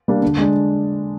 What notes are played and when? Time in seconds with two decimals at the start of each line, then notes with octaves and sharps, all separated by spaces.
0.08 G3 A#3 D4
0.22 D3
0.38 G#3 D4